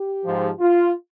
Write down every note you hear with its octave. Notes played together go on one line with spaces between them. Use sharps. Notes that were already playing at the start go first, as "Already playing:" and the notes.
Already playing: G4
G#2 F3
F4